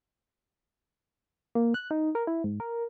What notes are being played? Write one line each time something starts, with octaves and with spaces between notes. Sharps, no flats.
A#3
F#6
D#4
A#4
E4
G#2
A#4